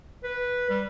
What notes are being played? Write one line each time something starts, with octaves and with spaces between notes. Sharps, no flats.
B4
G3